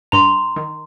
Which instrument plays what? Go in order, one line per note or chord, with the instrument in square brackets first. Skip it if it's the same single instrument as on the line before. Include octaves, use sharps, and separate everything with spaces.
[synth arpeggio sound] G2 [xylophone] A#5 C6
[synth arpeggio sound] D#3